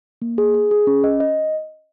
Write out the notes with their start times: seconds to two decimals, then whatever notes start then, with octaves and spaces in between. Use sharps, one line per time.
0.22 A#3
0.38 G#4
0.54 G#4
0.71 G#4
0.87 C#4
1.04 D#5
1.20 D#5